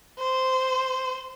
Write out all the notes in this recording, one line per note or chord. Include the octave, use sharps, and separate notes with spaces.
C5